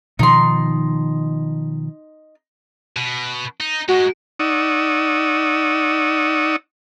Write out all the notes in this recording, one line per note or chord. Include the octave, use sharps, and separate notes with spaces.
B2 D#3 F3 D#4 C6
B2
D#4
G#3 D#4 F#4
D#4 D5 F#5 C#6 D#6 E6